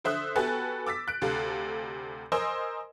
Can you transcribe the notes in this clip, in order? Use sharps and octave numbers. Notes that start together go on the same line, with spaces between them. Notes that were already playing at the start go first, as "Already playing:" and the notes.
D3 C5 E5 D#6 F#6
B3 F#4 G4 A4 B4 G#5
D6 E6 A6 B6
F#6 D7
D2 C3 A4 F5
A#4 C5 D#5 G#5 C6 E6